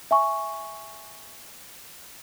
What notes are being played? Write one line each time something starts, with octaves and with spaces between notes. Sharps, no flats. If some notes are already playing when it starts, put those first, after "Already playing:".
E5 G#5 C#6